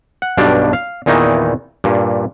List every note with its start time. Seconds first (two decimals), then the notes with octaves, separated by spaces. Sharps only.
0.22 F#5
0.37 B1 G2 B2 D4 F5 G5
0.73 F5
1.06 E2 A#2 D#3 E3 D#4
1.84 G2 A#2